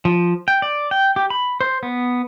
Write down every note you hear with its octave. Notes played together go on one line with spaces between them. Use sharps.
F3
G5
D5
G5
G4
B5
C5
B3